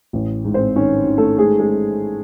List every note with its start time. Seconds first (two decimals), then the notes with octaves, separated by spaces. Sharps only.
0.13 A1
0.44 G#2
0.54 C4 C5
0.76 D#3 C#4 C#5
1.06 D#3
1.18 A3 A4
1.38 G#3 A3 G#4
1.59 G#3 G#4